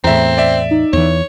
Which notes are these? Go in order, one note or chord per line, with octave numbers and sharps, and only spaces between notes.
E2 A2 C4 E5 A#5
D5 E5
D#4
E2 E3 C#5